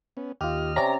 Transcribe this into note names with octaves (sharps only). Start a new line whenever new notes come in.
B3 C#4
D#2 F4 G4 D#5 F6
C3 C#4 D5 A#5